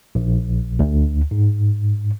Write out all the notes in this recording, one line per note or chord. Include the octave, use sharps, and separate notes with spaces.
A#1
D2
G#2